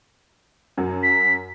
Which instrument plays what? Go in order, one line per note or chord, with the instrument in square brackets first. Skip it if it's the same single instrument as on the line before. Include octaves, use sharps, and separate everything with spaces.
[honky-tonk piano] F#2 F#3
[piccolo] B6